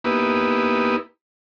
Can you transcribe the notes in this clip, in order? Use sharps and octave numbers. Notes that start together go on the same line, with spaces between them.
A#3 B3 D#4 E4 G4 B4